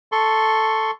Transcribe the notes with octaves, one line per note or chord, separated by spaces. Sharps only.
A4 C6 C#6